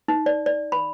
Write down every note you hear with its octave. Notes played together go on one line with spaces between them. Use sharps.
D#4
D5
D5
B5